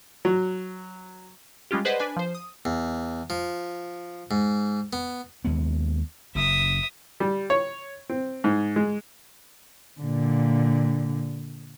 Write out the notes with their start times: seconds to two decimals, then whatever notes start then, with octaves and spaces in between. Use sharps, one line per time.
0.25 F#3
1.71 G3 G#3 C#4 F4 G4
1.85 G#4 B4 C5 D5 D#5 F#5
2.00 D4 B4 G#5
2.16 F3 C5
2.35 D#6
2.65 E2
3.30 F3
4.31 G#2
4.93 B3
5.45 D#2 G#3 B3
6.35 F#1 F#2 E5 D#6
7.20 G3
7.50 C#5
8.09 C4
8.44 G#2
8.76 G#3
10.01 A#2 D3